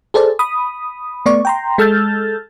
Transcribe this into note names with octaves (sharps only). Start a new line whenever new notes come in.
G#4 A4 C5 D5 A5
B5 D#6
A3 B3 D5 C#6
G5 A#5 C6
G#3 A4 E6 F6 G6 A6